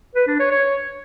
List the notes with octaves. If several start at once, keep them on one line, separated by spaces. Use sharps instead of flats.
B4
D4
C#5
C#5